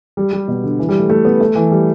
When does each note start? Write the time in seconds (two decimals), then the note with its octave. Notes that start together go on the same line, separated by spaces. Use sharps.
0.17 G3
0.33 G3
0.48 B2
0.64 D3
0.79 E3
0.89 G3
0.99 A3
1.10 A3
1.25 B3
1.40 A3
1.55 E3
1.71 G3